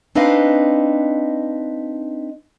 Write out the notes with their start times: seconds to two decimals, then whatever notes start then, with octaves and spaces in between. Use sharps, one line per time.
0.15 C4 D4 D#4 B4 D#5 F5